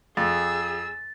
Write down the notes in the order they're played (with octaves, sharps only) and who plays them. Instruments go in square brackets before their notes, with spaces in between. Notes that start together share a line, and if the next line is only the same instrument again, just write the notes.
[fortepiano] F2 [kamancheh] G#4 E6 [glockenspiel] A6